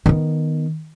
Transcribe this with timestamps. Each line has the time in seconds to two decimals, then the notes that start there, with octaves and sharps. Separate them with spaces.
0.06 D#3 B3